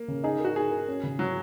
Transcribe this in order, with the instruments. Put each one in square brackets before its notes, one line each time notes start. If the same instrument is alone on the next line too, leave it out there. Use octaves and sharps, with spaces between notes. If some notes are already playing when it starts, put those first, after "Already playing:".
Already playing: [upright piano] A#3
[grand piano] C#3
[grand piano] D#4 [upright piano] G#4
[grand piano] A#4
[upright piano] F#4
[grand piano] D#4 [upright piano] G#4
[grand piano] A#4
C#4
C#3
[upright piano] F#3 [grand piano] F#4